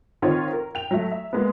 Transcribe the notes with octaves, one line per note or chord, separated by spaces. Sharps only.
D#3 C4 D#4 F4 C#5
A#4
G5 F7
F#3 A3
E5
G#3 A#3 B3